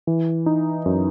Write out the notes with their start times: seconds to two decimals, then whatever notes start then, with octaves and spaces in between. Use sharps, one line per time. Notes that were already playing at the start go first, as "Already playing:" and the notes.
0.07 E3
0.46 D#4
0.86 F#2